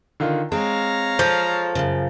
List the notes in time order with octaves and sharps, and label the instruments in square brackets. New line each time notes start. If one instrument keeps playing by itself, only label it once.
[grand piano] D3 D#3 F4
[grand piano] G#3 [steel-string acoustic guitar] C4 [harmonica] C#5 F5 A#5
[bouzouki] F3 [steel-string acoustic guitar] A4
[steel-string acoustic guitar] F#2 C#3